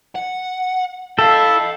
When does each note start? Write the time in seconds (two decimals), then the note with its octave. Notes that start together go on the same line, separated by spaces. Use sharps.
0.16 F#5
1.19 E4 A4 F5 G5